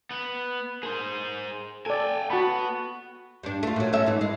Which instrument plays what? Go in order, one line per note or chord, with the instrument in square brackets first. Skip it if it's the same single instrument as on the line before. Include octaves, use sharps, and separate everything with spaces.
[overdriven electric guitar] B3
[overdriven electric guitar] G#4 C5 [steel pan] A#4
[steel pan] A4 D5 [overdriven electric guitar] G5 G#5
[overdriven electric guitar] B3 [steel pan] F#4 A5 B5
[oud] G2 D4
A3 F4
A#2 F#3
C#4 A4 E5
G#2 E3
G#3